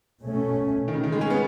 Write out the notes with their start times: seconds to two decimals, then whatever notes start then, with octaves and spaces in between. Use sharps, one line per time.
0.21 B2 A3 C#4
0.88 D#3
0.94 C#3
1.03 D#3
1.12 G#3
1.21 C#4
1.30 B3